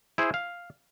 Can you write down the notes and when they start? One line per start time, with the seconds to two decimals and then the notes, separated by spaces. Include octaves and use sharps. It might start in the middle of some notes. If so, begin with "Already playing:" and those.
0.18 E4 G#4 C5
0.34 F5